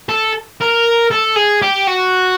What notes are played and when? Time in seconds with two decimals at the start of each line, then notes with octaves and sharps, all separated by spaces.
0.09 A4
0.61 A#4
1.11 A4
1.36 G#4
1.62 G4
1.87 F#4